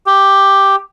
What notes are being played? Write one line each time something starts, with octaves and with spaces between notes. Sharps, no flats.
G4